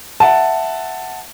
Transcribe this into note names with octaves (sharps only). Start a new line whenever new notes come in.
E5 F#5 A5